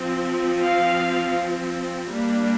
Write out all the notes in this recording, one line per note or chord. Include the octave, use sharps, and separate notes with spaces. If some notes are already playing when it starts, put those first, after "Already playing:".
Already playing: F3 C4
F5
G3 A#3 D4